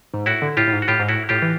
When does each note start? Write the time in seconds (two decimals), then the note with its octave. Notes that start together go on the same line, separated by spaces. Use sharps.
0.14 G#2
0.26 A2 E4 F#4
0.42 D3
0.57 A2 F4 G4
0.68 A2
0.73 G#2
0.82 F#4
0.88 A2 F4 G4
0.99 G#2
1.09 A2 E4 F#4
1.29 A2 F4 G4
1.42 E3